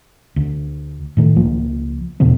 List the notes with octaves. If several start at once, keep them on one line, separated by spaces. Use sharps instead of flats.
D2
A2 D#3 A3
C#2 F3 A#3
E2 B2 D3 C4